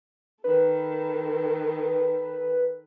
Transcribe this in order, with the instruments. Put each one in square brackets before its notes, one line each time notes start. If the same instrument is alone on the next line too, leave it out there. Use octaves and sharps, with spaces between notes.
[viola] D#3 A4 [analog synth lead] B4